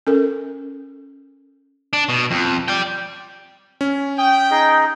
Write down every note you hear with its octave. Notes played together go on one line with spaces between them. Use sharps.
C#4 A4 A#4
D4
B2
F2
D5 G5
C#4
G5 D#6
D#4 G#4 D#5